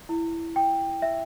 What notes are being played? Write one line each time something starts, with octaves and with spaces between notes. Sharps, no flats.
E4
G5
E5